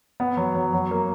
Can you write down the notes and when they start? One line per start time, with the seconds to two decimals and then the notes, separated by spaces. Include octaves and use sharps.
0.20 B3
0.37 F#3
0.55 F#3
0.73 F#3
0.91 A#3